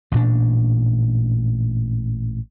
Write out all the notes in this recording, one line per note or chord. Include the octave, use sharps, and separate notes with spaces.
A1 G2 A#2 D4